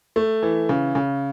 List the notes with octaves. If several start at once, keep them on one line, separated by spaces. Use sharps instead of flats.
A3
E3
C#3
C#3